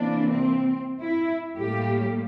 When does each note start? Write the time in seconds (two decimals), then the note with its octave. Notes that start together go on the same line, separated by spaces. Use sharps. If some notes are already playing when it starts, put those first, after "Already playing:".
Already playing: C3 E3 A#3 D4
0.29 C4
1.00 E4
1.56 A2 G3 A#3 G4